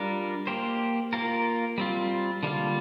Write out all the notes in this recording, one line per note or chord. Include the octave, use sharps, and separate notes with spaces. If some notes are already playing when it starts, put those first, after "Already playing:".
Already playing: G3 D4 F4 A#4
A#3 G4 C5
A#3 F4 A#4
G3 C4 F4
D3 G3 A#3 F4